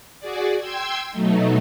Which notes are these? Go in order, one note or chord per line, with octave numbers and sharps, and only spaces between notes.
F#4 G#4 D5
G5 C6 E6 G#6
B2 F#3 A3 D#4